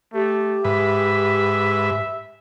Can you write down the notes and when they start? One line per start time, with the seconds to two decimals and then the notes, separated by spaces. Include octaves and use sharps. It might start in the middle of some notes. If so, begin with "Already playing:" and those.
0.14 A3 G4
0.65 G#2 B4 E5